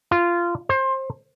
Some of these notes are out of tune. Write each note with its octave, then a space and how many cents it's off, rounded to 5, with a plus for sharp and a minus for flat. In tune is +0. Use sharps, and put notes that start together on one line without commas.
F4 -15
C5 +25